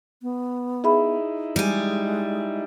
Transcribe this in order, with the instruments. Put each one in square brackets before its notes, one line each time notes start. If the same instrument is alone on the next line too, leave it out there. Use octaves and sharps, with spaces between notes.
[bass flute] B3
[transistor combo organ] D#4 E4 [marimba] G#4 E5 B5
[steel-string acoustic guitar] G3 G#5 [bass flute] G#3